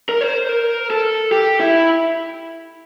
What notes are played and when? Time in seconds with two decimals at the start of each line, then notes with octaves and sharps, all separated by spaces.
0.09 A#4
0.21 C5
0.49 A#4
0.90 A4
1.32 G4
1.60 E4